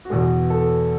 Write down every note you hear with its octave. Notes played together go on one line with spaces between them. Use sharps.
F#4
E2 B2 G#3 G#4
A4